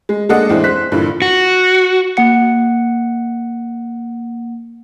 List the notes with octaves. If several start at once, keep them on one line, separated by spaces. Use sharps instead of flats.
G#3
G#3 A#3 D4 A4 D#5 F#5
E2 A2 G#3 C4 D4 E4
C5 F#6 B6
G2 A#2 D3 E3
F#4
A#3 F#5 C#7